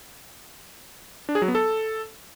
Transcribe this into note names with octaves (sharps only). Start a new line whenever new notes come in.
D4
G#4
F#3
B3
A4